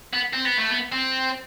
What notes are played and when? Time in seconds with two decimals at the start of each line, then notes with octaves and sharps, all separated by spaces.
0.13 B3
0.33 C4
0.45 B3
0.58 A3
0.70 B3
0.92 C4